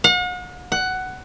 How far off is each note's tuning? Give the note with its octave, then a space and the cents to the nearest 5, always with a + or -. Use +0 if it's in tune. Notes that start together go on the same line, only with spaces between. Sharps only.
F#5 -45
F#5 +10